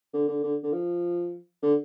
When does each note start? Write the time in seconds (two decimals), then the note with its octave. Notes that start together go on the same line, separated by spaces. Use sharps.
0.14 D3
0.28 D3
0.43 D3
0.63 D3
0.72 F3
1.63 D3